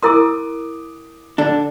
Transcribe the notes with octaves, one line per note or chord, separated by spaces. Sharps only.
E4 A#4 C6 D6 D#6
D3 D4 A4